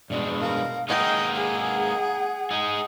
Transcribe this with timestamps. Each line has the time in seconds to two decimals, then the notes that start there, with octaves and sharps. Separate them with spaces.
0.10 G2 B2 G#3 D5
0.41 A#4 F5
0.89 G#3 A#3 D#4 D#5 F#5 G5
1.35 G#4
2.51 D#4 G#4